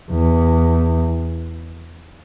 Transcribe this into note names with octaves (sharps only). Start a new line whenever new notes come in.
E2